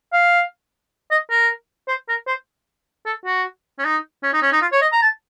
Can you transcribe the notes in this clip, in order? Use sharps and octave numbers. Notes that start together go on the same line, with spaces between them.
F5
D#5
A#4
C5
A#4
C5
A4
F#4
C#4
D#4
C#4
D#4
C#4
D#4
F4
C#5
D#5
A#5
A5